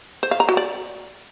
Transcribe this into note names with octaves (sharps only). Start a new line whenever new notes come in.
C5
F5
A#5
F#4
D5